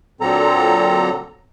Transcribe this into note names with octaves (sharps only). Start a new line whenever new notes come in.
A#2 D3 F#3 C4 A4 A#5